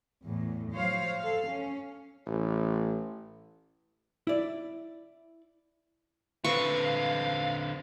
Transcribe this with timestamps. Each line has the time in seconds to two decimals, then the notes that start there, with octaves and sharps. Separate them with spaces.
0.24 E2 A2
0.72 F3 F#3 C5 C#5 F5
1.19 A4 F5
1.47 C#4
2.26 A1
4.27 E4 D5
6.44 D3 C4 B4 F5 C#6